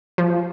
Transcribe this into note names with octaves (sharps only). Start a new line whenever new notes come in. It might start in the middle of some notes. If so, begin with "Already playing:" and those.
F3